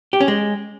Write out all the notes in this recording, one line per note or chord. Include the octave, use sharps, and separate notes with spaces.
G4
C#4
G#3